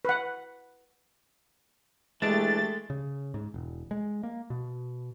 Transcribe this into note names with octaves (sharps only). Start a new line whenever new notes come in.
B4 F#5
E3 G#3 A3 D4 G4 A6
C#3
G#2
E1
G#3
A#3
B2